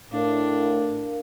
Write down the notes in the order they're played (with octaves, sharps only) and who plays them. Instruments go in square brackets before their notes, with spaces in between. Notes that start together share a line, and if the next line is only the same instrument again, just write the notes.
[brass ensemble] A2 [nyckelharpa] D4 [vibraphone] A#4 F5